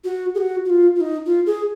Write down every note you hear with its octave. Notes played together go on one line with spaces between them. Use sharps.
F#4
G#4
F#4
F#4
F4
F4
D#4
F4
G#4